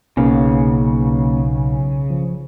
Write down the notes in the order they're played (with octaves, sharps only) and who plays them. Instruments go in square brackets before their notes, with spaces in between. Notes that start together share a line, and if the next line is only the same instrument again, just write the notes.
[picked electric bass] B1 [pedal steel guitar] C#3 [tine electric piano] A#3 C#4
[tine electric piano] F3